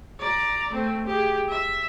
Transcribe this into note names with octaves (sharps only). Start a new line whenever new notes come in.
D5 A#5
A3 C4
G4 G#4
E5